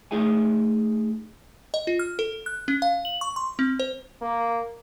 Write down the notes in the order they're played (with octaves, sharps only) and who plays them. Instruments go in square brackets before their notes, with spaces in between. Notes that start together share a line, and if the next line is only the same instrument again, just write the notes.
[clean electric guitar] A3 D#4 G#4 E5 G#5
[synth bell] D#5
F4
F6
A4
F#6
C#4
F5
F#7
C#6
C6
C4
C5
[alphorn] A#3